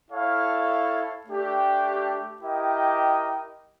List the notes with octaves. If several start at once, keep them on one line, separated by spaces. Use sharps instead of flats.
E4 A4 C#5 F5
A3 D4 G4
E4 G4 A#4 D#5 G5